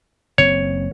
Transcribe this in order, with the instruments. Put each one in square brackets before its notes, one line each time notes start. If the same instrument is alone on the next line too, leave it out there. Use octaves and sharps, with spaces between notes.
[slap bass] F#1 C4 [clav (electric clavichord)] C#5